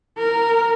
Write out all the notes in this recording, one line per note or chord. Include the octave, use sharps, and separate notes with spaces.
A#4